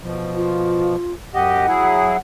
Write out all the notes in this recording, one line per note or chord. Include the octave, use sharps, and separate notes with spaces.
B2 F3
F4
F#2 G4 D#5 F#5
F#3 E4 G#4